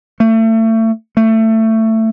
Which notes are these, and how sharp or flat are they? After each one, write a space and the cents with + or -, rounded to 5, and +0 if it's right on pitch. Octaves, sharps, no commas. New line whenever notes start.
A3 +30
A3 +20